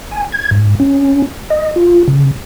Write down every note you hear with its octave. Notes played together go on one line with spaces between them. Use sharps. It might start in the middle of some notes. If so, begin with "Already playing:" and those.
G#5
G#6
G#2
C#4
D#5
F4
C#3